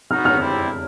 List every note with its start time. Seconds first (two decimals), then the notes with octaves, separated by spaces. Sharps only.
0.11 B3 D#4 F#4 F6
0.25 F6
0.39 G3 C4 E4